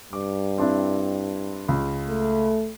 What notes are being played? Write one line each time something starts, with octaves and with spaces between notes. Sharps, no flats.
G2 D6
C4 D4 E4
C#2
A3